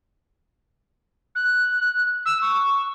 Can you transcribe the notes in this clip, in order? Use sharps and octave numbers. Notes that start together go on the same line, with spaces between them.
F#6
E6
C#6